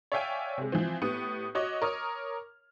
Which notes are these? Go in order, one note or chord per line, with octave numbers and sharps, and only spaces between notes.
C#5 D5 E5 F5 G5 G#5
C3 G#3
E3 F3 C4
A2 B3 G4 D#6
F#4 C#5 D#5 D6
A#4 C#5 D6 D#6 F6